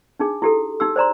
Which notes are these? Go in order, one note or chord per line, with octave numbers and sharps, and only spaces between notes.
D4 D#4 G#4
E4 G4 A4
D#4 G4 E6
C5 D5 A#5 C6